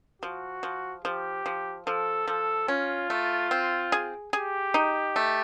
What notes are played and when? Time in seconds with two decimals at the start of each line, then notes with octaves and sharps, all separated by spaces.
0.22 F3 F#4
0.63 F3
1.05 F3 G4
1.46 F3
1.87 F3 A4
2.27 F3 A4
2.68 C#4 F4
3.10 A3
3.51 C4
3.92 G#4
4.33 G4 G#4
4.74 D#4
5.16 A3